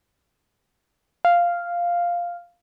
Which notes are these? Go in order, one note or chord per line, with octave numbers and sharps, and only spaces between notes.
F5